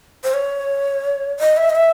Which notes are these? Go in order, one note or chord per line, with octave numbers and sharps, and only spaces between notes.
C5
C#5
D#5
E5
D#5
E5